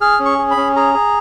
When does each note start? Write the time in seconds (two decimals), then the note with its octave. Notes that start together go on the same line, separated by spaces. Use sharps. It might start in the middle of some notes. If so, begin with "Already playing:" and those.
0.01 G#4 F6
0.19 C#4
0.25 C#6
0.38 G#4
0.51 B5
0.57 C#4
0.76 G#4 A#5
0.94 G#4